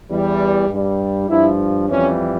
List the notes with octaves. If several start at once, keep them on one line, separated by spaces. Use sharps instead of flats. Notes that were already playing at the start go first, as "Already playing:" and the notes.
E2 E3 G3
G2 G3
G2 F3 E4
F2 E3 G3 C#4